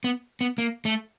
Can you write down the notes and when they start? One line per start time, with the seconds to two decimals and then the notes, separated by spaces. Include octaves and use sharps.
0.04 B3
0.41 B3
0.58 A#3
0.85 A3